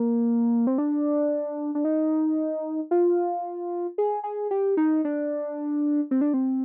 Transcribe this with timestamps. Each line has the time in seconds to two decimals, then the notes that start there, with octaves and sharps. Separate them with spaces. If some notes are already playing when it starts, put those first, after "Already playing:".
Already playing: A#3
0.67 C4
0.78 D4
1.75 D4
1.85 D#4
2.91 F4
3.98 G#4
4.24 G#4
4.51 G4
4.77 D#4
5.05 D4
6.11 C4
6.21 D4
6.34 C4